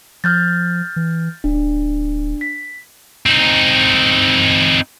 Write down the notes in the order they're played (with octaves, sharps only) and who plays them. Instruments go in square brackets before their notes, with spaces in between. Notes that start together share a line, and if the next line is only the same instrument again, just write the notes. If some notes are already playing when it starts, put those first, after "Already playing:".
[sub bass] F3 [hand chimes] F6 G6 A6
[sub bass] E3
[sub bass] D1 [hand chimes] D4
[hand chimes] B6
[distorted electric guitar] C4 D#4